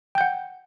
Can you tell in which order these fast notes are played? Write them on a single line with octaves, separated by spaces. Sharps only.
G5 G6 F#5